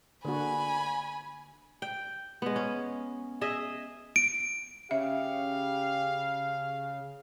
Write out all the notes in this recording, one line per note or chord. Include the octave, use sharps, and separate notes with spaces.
D3 A#3 F#4 G#5 B5
G5
G#3 B3
C#4
G#4 D#5 E5
D7
C#3 G4 E5 F5